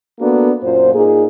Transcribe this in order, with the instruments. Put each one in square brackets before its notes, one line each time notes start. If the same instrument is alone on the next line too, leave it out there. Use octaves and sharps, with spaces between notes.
[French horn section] A#3 B3 D4 F#4 A4
F#2 A#2 F4 C5
A#2 A#3 D#4 G#4